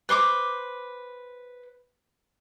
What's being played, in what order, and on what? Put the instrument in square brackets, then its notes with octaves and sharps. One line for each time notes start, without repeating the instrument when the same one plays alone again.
[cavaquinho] B4 C5 C#6 D6